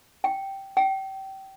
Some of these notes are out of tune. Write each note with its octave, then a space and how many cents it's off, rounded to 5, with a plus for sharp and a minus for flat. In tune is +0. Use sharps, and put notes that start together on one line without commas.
G5 -10
G5 -25